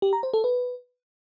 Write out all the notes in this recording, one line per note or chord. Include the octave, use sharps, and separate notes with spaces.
G4
A#5
C5
A4
B4